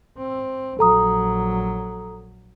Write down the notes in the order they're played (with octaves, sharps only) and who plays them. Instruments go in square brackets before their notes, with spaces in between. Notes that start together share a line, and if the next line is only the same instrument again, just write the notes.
[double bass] C4
[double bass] A#1 F#3 [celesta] A4 A#5 D#6